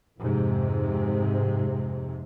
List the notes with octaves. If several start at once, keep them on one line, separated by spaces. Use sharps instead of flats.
F2 G#2 C3